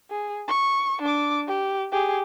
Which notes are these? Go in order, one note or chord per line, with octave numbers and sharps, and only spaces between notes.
G#4
C#6
D4 D6
G4
G4 G#4